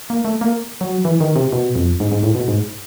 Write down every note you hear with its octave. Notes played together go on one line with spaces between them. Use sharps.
A#3
A3
A#3
F#3
E3
D#3
C3
B2
F2
G#2
G#2
A2
B2
G#2